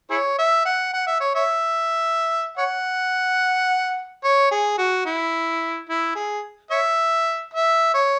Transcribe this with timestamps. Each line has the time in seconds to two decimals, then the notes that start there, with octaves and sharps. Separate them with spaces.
0.10 E4 G#4 C#5
0.38 E5
0.65 F#5
0.94 F#5
1.07 E5
1.20 C#5
1.35 C#5 E5
2.58 C#5 F#5
4.24 C#5
4.52 G#4
4.78 F#4
5.06 E4
5.89 E4
6.15 G#4
6.71 C#5 E5
7.54 E5
7.94 C#5